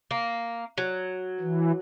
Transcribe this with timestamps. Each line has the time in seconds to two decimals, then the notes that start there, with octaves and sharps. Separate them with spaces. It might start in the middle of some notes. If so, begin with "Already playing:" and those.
0.11 A#3
0.78 F#3
1.40 E3